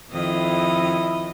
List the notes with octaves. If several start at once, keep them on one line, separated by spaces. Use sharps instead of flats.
F2 D#3 E4 D#5